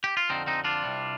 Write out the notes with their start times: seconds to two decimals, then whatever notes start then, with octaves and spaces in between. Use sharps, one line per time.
0.04 G4
0.17 F4
0.29 F2 D3 F3 C4 D#4
0.47 C4 D#4
0.64 D4 F4
0.83 C2 C3 G3